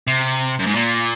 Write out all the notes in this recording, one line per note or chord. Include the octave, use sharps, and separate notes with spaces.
C3
F#2
G#2
A#2